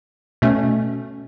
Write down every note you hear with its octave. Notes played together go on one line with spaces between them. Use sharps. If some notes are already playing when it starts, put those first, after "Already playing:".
B2 A3 C#4